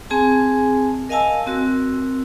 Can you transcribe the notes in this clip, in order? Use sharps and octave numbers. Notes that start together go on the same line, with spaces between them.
C4 G#4 G#5 A5
A#4 D#5 F5 G#5 A5 E6
C4 F#4 A#4 E6